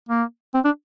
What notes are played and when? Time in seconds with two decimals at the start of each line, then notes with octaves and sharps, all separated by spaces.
0.09 A#3
0.55 C4
0.65 D4